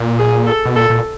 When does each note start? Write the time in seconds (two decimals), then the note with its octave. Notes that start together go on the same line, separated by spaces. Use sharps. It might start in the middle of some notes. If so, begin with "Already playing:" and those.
Already playing: A#2
0.19 G#4
0.47 A4
0.65 B2
0.76 A#2 A4
0.90 A#2